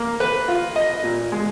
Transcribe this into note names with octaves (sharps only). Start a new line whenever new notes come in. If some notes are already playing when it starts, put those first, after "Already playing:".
Already playing: A#3
B4
F4
D#5
A#2
G#3